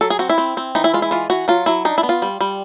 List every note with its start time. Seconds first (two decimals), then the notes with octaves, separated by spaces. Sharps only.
0.01 F#3 A4
0.10 G#4
0.19 C4 F#4
0.30 E4
0.38 C4
0.57 C4
0.75 E3 D#4
0.84 E4
0.94 G#3 F4
1.02 E4
1.11 E3 F4
1.30 E3 F#4
1.48 F#3 F4
1.66 F#3 E4
1.85 D4 D#4
1.98 E4
2.03 B3
2.09 F4
2.22 G3
2.41 G3